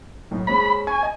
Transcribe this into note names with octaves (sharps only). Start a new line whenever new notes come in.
B1 A2
G#3 C#4 C5 B5
G#5 C#6
D#5